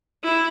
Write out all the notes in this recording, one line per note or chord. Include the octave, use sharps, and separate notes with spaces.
E4